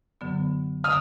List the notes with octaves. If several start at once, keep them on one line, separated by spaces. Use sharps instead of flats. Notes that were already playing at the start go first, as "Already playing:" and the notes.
F#2 D3 F#3 B3
D3 D#6 F6